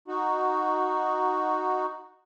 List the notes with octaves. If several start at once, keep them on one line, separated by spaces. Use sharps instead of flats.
D#4 F#4